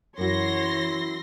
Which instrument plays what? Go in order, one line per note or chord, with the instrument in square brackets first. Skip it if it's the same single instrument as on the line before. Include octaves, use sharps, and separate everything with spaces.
[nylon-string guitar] F#2 F#4 [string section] E3 C6 A#6 [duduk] E4 [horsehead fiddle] C#5